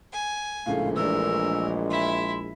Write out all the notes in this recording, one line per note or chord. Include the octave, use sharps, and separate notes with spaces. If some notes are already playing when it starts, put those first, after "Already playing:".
G#5
A#1 A2 C#3 G#3 A3 F5
E3 A3 D4 A#4 E6
E4 E5 C6